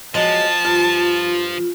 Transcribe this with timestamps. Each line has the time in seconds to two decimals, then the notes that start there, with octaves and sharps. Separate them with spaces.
0.15 F3 F#3 G#3 A5
0.65 G2 F4